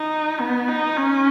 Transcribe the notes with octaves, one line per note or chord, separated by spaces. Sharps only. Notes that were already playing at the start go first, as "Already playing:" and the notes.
Already playing: D#4
B3
D#4
C#4